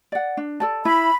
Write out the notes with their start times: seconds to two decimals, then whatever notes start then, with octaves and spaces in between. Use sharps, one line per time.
0.12 D5 F#5
0.37 D4
0.60 A4 D5 A5
0.85 E4 B5